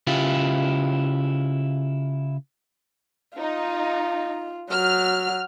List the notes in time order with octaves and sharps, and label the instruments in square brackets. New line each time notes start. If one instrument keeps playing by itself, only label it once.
[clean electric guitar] C#3 E4 F4 G4
[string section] D#4 [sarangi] F4
[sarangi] F#3 [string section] F6